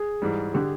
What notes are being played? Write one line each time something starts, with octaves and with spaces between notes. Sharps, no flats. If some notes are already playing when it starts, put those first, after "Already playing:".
Already playing: G#4
G#2 E3 G3
D3 G4